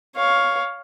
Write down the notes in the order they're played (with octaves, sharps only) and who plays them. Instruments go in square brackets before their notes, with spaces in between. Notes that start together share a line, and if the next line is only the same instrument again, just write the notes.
[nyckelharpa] C#5 F5